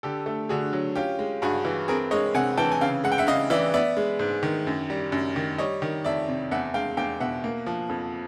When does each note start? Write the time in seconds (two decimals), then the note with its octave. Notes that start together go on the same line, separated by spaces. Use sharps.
0.03 D3 G4 A4
0.26 A3
0.49 D3 F#4 G#4
0.73 F#3
0.95 C#4 F4 G4
1.19 G#3
1.42 G2 F#4 G#4
1.65 E3
1.88 C4 G#4 A#4
2.11 G#3 C#5 D#5
2.34 C3 F#5 G#5
2.58 E3 G5 A5
2.72 G#5
2.81 C#3 F5 G5
3.04 G#3 F#5
3.12 G5
3.18 E5 F#5
3.27 C#3 D#5 F5
3.50 E3 D5 E5
3.74 B3 D5 E5
3.97 G#3
4.19 G#2
4.43 D#3
4.67 F#2
4.90 G3
5.12 F#2
5.36 D#3
5.58 G3 C#5 D#5
5.82 D#3
6.04 F2 D5 E5
6.28 C3
6.51 E2 E5 F#5
6.74 G#3 F5 G5
6.97 E2 F5 G5
7.20 B2 E5 F#5
7.44 A#3
7.66 F3
7.90 F2